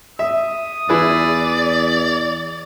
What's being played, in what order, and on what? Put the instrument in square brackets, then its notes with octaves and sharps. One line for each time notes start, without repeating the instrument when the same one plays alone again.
[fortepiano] E5 [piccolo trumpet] D#6
[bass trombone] E2 [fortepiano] E4 G#4 B4 [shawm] D5